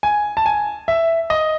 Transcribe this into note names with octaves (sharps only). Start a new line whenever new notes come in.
G#5
A5
G#5
E5
D#5